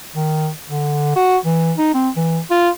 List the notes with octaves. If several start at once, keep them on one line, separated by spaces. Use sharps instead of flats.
D#3
D3
F#4
E3
D#4
C4
E3
F4